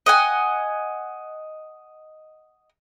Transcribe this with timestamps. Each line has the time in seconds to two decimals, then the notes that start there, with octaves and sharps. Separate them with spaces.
0.06 D#5 F#5 G#5